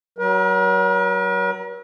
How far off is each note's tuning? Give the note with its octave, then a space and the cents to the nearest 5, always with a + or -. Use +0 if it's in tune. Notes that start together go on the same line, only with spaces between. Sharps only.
F#3 +25 A#4 +45